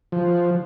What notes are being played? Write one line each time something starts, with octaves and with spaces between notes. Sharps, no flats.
F3